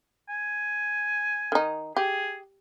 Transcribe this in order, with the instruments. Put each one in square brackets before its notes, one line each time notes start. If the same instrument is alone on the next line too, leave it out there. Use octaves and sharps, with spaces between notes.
[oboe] G#5
[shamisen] D#3 D#4
[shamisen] G4 [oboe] G#4